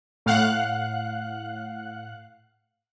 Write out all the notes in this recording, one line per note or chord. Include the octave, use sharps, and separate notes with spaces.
A2 F5 F#5 F#6